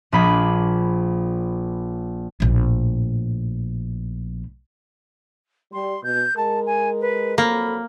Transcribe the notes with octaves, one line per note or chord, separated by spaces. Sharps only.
A#1 A#2 G#4 B5
A#1 A2
G3 C6
B2 G6
G#3 A#4 A5
G#5
B4
F2 F#3 A#3 A4 B5